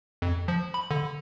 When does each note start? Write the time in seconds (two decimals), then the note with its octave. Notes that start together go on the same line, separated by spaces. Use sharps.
0.22 F2
0.48 F3
0.74 B5
0.91 D3